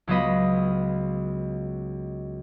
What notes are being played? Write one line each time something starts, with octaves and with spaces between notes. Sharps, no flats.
C#2 F#3 B3 F4 D#5 B5